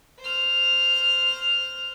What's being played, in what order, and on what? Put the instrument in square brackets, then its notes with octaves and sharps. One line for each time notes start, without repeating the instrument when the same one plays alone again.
[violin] C5 F6